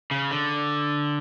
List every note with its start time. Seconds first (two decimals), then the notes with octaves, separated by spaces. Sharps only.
0.11 C#3
0.31 D3